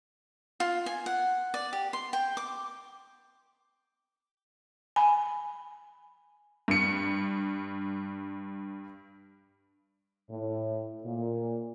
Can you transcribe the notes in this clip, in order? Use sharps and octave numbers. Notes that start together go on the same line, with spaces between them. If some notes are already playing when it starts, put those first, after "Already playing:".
F4
G#5
F#5
D5
G4
C6
G5
D6
G#5 B5
G2 C#7
A2
A#2